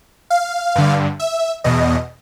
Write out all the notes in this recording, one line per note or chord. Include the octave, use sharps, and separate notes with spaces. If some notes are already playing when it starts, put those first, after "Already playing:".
F5
G2 D3
E5
E2 B2 D#5